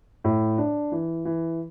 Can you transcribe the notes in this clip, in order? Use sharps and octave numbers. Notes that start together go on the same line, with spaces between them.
A2
D4
E3
E3